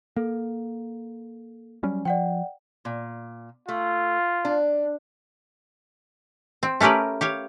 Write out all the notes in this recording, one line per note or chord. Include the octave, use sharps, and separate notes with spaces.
A#3 A4
F#3 G3 C#4
F3 D5 F#5 G5
A#2
A3 F4
D4
C4
A3 C#4 G4 A#4 B4
G4 C#5 F5